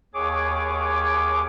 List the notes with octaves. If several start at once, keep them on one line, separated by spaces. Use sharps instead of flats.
D#2 G#4 C#5 D6